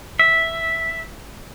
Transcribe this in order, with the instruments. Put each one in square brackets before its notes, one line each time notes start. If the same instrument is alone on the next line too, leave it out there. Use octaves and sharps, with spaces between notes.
[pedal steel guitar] E5